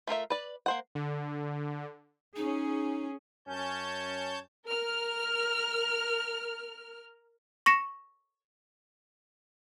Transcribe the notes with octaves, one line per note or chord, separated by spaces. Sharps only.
A3 F4 A#4 E5
B4 D5
A#3 C5 F#5
D3
C#4 D#4 G#4
F#2 C#4 C#5 A5 G6
A#4 F6
C#6 A#6 C#7 E7